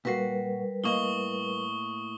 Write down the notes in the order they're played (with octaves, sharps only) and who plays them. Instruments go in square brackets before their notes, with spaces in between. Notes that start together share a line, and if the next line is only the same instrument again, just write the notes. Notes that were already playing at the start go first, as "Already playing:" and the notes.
[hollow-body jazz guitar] A#2 F#4 [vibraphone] G3 A#4 B4
[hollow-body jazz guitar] A2 A#3 D#5 [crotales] C#6 D#6 G7